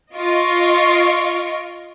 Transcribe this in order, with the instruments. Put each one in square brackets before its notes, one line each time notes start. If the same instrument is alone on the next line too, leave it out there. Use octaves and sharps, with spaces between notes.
[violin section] F4 D#5 C#6 D7